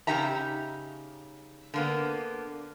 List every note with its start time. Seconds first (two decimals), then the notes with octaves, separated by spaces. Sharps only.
0.07 C#3 B3 D#4 G4 E5 A#5
1.74 D3 A#3 B3